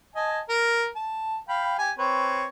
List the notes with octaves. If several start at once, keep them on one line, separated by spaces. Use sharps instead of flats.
D#5 G#5 A5
A#4
A5
F5 G5 B5
G4 G#5
C4 B4 C#5